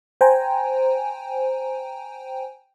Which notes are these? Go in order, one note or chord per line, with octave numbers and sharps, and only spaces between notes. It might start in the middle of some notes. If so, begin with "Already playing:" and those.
C5 G5 G#5 A#5